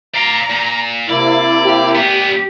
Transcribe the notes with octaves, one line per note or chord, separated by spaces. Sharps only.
D5 F5 A#5
A#2
C3 A#3 E4 D5
G4
A#2 B3